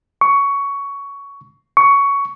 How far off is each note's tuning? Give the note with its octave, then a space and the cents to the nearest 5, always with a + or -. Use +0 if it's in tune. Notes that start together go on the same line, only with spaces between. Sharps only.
C#6 +15
C#6 +15